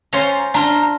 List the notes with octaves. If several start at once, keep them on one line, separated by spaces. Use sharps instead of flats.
C#4 F4 C5 C#5 A#5
D4 F4 A#5